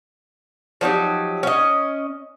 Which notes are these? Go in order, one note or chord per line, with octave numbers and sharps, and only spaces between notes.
F3 F#3 D#4 G4
C#4 D#5